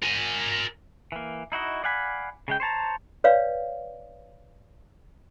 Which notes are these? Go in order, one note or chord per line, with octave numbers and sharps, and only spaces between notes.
A#4 G#5
E3 A#3
D#4 E4 F#4 D#5
D5 F5 F#5 G#5 B5
C#3 G#3 G5
C5 C#5 A5 A#5
B4 C#5 D5 F5